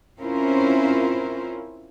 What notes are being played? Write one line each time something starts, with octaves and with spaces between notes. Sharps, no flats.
C4 C#4 E4 F4 A#4 C5